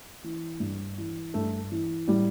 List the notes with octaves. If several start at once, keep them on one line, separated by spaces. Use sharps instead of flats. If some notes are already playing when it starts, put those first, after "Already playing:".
E3
G2
E3
G2 A3
E3
A2 G3